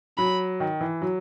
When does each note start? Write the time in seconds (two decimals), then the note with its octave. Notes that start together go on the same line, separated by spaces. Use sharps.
0.18 F#3 B5
0.60 D#3
0.81 E3
1.02 F#3